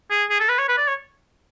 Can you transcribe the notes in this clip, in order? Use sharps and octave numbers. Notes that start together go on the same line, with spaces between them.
G#4
G#4
A4
B4
C#5
B4
D5
C#5